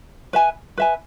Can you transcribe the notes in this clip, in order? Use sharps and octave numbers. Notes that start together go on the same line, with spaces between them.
B4 E5 G#5
B4 E5 G#5